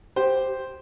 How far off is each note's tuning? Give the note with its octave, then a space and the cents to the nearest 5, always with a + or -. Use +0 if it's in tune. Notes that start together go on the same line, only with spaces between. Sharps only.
G4 +0 C5 +0